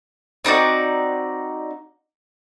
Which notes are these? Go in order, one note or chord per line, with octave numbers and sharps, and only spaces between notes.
C4 D#4 F#4 D5